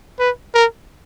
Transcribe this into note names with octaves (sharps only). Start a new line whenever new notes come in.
B4
A#4